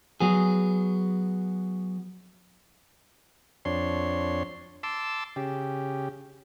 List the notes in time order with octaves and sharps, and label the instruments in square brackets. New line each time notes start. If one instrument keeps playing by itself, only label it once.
[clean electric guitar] F#3 B3 G#4
[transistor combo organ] F2 D4 C#5 C6
A5 C6 D6 E6
C#3 G4